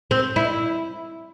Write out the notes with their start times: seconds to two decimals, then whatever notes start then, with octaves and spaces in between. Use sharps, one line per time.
0.11 C4
0.36 E4